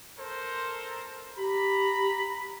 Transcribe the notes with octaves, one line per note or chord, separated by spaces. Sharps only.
A4 A#4 C5
G4 A#5 B5